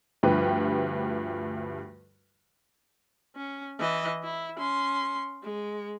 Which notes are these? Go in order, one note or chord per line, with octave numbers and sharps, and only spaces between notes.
D2 G2 F3 G4 B4
C#4
E3 D#5
E4
C#4 C6
G#3